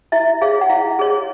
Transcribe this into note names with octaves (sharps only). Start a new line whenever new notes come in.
E4 E5
G#4 C#5 F5
F#5
E4 F5
G#4 C#5